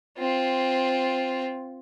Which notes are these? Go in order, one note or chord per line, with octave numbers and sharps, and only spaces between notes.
C4 F4